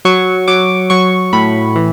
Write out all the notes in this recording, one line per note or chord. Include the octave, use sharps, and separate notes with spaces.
F#3 C#6
F#3 D6
F#3 C#6
A2 B5
E3